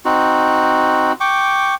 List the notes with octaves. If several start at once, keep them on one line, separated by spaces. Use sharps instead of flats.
C4 D#4 F#4
G5 C#6 D6